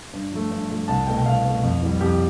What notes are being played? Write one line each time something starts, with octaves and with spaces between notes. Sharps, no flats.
G2
F3 A3
G2
F3 A3
C2 A5
B2 A3 G5
G5
C2 F5
B2 A3
F2
E3 G3
F2 G4